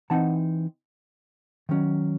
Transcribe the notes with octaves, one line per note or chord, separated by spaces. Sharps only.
E3 C4 D#4 F#5 A5
D#3 F#3 C#4